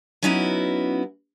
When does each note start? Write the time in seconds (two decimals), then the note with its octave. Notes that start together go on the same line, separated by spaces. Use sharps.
0.23 F#3 B3 C#4 D#4 E4 F#4